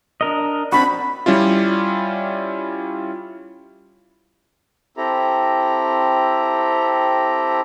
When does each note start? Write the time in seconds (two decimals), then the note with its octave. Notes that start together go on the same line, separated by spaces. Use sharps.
0.21 D4 A#4 D#5
0.72 C4 D4 F#4 B5
1.26 G3 C#4 E4 F4
4.97 C4 E4 G4 A4 A#5